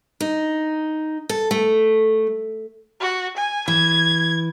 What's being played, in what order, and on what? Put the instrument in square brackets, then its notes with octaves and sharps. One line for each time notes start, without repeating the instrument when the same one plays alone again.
[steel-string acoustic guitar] D#4
A4
A3
[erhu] F#4
G#5
[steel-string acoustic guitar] E3 [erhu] G#6